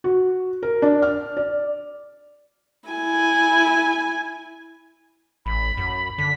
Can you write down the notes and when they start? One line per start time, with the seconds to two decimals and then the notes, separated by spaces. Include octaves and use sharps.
0.04 F#4
0.63 A#4
0.82 D4
1.02 F6
1.37 D5
2.89 E4 G#5
5.46 A1 B5
5.77 F#2
6.18 D3 B6